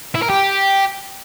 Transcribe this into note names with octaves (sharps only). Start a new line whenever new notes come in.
E4
A#4
G4